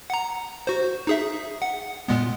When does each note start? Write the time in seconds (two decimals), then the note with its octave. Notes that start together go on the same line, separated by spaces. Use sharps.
0.10 F#5 A#5
0.67 F#4 C5
1.07 D#4 G#4 E5
1.62 F#5
2.08 A#2 G#3 B3